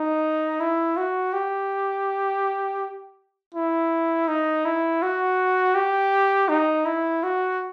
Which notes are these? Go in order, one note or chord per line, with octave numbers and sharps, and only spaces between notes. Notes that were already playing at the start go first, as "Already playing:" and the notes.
Already playing: D#4
E4
F#4
G4
E4
D#4
E4
F#4
G4
D#4
E4
F#4